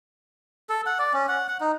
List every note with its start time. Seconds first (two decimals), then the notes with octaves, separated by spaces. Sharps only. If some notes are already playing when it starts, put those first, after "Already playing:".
0.69 A4
0.86 F#5
0.99 D5
1.14 C#4
1.28 F#5
1.48 F#5
1.61 D#4